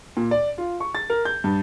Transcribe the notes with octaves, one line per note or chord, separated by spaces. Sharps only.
A#2
D5
F4
C#6
A6
A#4
G6
G2